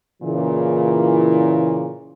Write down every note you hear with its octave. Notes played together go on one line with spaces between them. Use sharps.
A#2 C#3 E3